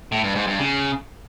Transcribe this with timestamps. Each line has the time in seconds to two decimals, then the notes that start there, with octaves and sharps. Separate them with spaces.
0.12 A2
0.24 G2
0.35 G#2
0.47 G2
0.59 C#3